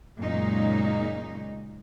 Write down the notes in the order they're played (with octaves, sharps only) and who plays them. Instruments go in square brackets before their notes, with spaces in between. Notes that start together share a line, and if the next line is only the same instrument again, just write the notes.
[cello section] F#2 A#2 C#3 G#3 D#4